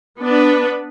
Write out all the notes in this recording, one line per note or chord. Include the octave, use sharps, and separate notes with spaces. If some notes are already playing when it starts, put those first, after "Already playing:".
B3 D4 B4